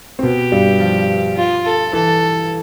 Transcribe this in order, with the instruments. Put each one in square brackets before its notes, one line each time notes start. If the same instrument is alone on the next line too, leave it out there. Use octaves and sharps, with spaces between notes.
[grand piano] C4
[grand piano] B2 B3 [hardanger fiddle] G4
[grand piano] G2 G3
F3
[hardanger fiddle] F4
A4
[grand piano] E3 [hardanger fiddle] A4